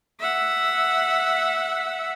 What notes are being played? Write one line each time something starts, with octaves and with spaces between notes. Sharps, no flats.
E5 F#5